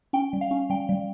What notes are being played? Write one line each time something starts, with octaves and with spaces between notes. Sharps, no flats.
C#4 G5
G3
F5
C#4
G3 G5
G3